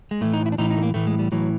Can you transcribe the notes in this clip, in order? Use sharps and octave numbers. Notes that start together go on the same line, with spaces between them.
G#3
A2 E3 A3
D#4
E4
D4
A2 E3 D#4
D#4
A3
A#3
A2 E3 A3
G#3
G3
A2 E3 F#3